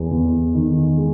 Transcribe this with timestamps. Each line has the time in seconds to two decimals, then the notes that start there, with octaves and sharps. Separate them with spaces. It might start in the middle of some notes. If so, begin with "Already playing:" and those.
Already playing: E2
0.11 E2
0.54 D#3
0.98 G#3